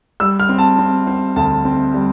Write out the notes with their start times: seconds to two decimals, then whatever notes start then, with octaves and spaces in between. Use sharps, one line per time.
0.20 G3 E6
0.40 F6
0.49 C4
0.58 A5
0.78 C4
1.07 C4
1.36 D2 A5
1.65 C4
1.94 G3